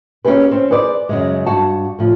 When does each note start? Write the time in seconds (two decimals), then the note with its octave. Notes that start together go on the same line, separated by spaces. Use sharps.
0.25 A#3 C#4 D#4 G4 G#4 B4
0.51 C4 C#4
0.71 G#4 B4 C5 D5
1.09 F#2 C#3 G#3
1.46 G2 F#4 A5
1.99 A2 F3